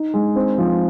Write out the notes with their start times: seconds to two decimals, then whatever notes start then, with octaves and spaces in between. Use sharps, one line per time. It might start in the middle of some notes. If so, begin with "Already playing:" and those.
Already playing: D#4
0.14 G#3
0.36 C4
0.58 F3